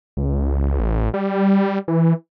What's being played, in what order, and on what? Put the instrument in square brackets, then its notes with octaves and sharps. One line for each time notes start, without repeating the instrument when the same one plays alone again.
[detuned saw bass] C#2
A1
G3
E3